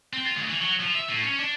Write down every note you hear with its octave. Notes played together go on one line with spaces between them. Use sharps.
C4
F4
D2
E3
F#3
F3
E5
A2
C#4
D4